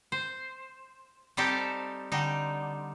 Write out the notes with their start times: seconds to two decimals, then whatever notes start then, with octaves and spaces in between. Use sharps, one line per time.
0.12 C5
1.37 G3 C4 D#4 G4 A4
2.12 D3 G3 D#4